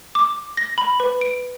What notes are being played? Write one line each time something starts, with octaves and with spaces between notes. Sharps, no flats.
D6
A#6
B5
B4
D7